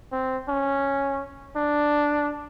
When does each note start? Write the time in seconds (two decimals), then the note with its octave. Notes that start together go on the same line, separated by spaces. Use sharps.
0.12 C4
0.48 C#4
1.56 D4